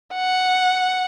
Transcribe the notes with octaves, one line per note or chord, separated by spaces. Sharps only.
F#5